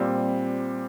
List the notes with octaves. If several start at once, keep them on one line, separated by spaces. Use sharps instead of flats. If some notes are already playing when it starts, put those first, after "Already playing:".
Already playing: A#2 G3 C4